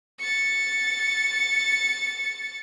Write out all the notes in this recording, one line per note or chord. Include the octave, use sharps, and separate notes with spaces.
A6 C#7